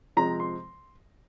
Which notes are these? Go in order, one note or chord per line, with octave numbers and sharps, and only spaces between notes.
F2 C3 F3 G#3 C4 A#5
C6